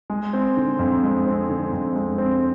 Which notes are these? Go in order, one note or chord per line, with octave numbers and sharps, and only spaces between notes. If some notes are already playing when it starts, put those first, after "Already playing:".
G#3
C4
D3
F2
G#3
C4
D3
F2
G#3
C4